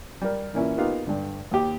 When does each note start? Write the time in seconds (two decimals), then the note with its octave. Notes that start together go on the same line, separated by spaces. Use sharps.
0.22 G3 A#4
0.54 A#2 E3 A#3 C#4 E4
0.77 A#3 B3 D#4 F4 G4 F5
1.07 G2 D3
1.51 D#2 G4